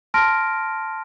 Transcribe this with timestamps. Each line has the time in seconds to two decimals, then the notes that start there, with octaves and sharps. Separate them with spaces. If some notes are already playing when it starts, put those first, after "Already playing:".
0.14 A5 C6 F6 A#6 D7